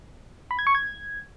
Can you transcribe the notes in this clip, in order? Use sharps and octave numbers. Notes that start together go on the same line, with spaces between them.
B5
G#6
C#6
G#6